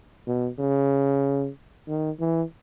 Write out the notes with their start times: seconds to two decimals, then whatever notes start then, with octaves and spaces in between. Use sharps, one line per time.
0.26 B2
0.58 C#3
1.88 D#3
2.20 E3